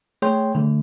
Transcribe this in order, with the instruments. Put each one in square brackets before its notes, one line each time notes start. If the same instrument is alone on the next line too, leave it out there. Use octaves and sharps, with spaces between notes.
[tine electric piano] A3 G#4 C#5 G5 C6 G6
D3 A3